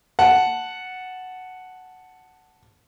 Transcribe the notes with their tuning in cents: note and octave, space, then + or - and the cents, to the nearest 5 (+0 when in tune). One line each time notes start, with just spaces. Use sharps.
F#5 +0 A5 +0